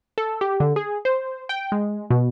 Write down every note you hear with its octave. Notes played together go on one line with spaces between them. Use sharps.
A4
G4
D3
G#4
C5
G5
G#3
B2